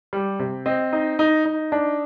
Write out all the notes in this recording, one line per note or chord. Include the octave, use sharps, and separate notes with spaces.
G3
C3
C4 D#5
D#4
D#4
D#4
D4